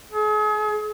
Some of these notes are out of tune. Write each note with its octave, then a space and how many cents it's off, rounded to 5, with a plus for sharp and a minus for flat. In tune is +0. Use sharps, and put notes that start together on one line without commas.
G#4 +40